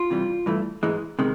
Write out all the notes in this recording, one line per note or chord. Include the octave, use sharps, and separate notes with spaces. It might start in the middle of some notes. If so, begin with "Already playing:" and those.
Already playing: F4
C3 E3 G3
G2 E3 A3
G#2 E3 G#3
C3 D#3 G#3